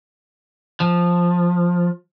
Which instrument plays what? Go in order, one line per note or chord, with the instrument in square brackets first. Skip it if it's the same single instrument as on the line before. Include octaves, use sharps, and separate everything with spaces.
[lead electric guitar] F3